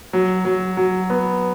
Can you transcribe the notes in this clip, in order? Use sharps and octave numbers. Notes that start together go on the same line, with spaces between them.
F#3
F#3
F#3
B3